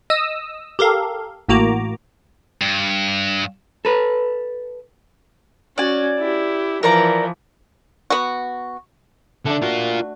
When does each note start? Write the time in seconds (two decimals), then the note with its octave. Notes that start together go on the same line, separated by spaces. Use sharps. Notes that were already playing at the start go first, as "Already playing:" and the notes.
0.10 D#5 D#6 E6
0.79 G4 A4 A#4 F5
1.49 A1 A2 A#3 F#4 A#5 D6
2.61 G2
3.85 A4 B4
5.78 C#4 F#4 D5 G#5
6.19 E4 G4
6.83 E3 F3 A#4 D5 A#5
8.10 B3 F#4
9.46 D3 A3 D4
9.63 F4 F#4 A#4